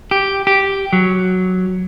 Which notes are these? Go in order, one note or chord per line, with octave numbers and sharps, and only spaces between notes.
G4
G4
F#3